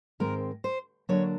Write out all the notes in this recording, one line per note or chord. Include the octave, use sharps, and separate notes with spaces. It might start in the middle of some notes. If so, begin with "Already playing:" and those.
G#2 D#3 G#3 C4 A#4
C5
D3 F#3 A#3 D4 C#5